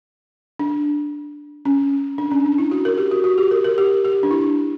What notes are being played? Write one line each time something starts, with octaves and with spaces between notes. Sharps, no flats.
D4
C#4
D4
C#4
D4
E4
F#4
A#4
G4
F#4
F#4
G4
A#4
A#4
G4
G4
D4
E4